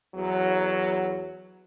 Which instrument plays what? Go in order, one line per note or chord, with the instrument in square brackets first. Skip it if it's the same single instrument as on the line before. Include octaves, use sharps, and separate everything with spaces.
[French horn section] E2 F#3